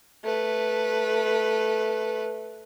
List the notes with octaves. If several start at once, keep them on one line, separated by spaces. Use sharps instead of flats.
A3 B4